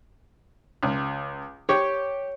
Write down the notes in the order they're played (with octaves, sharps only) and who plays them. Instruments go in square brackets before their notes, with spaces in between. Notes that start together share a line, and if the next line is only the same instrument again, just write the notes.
[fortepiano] C#2
[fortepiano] G4 [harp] C#5